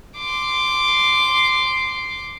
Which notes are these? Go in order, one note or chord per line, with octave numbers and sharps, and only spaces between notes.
C6 D6